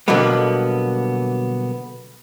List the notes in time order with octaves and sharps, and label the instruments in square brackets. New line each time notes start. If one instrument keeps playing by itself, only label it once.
[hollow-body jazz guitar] B2 D3 F#3 G3 A#3 B3